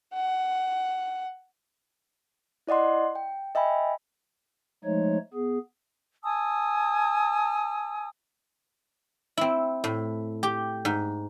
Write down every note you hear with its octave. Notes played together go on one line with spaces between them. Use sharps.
F#5
E4 D5 D#5 F#5 C6
G5
D#5 E5 G5 G#5 B5
F3 G#3 A3 D#4 C#5
B3 G#4
G#5 A5 D#6 E6
C4 E4
A2
G4
G#2